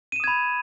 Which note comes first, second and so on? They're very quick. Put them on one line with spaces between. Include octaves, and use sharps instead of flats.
D#7 E7 D#6 G#6 B5